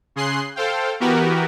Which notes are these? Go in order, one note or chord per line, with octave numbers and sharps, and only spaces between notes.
C#3 G#4 C6 F#6 C7
A4 C5 F5 G5
E3 B3 F#4 G4 A#4 B4